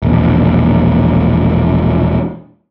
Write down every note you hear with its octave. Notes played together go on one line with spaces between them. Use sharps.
E1 A#1